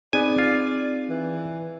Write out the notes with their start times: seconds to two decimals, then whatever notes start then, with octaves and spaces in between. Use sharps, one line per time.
0.13 B3 C4 D#4 G#4 D5 G#5
0.38 F4
1.10 E3